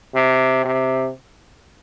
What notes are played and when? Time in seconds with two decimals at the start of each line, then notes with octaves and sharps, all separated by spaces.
0.15 C3
0.65 C3